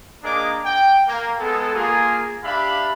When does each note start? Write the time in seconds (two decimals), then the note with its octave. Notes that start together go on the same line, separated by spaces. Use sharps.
0.23 A#3 D4 G#4 A#4 D#5 D6
0.65 G5
1.08 A#3
1.40 G#3 B3 G#4 A4
1.75 A#3 F4 G#4
2.44 D4 G4 E5 F5 B5